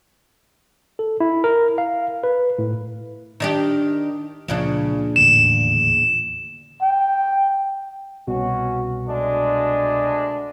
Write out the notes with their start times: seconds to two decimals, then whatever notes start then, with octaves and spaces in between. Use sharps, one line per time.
0.99 A4
1.20 E4
1.44 A#4
1.78 F5
2.24 B4
2.58 A2
3.40 D#3 D4 G4
4.48 C#2 A#2 C#3 F3 D4
5.16 D#1 E2 A2 D3 E7
6.82 G5
8.27 C2 B2 C#4 F#4
9.06 D2 G#3 D4